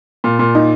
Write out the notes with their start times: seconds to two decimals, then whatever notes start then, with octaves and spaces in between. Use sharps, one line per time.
0.24 A#2
0.39 A#2
0.55 D#4